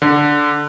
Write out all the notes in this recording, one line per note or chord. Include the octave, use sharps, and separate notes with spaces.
D3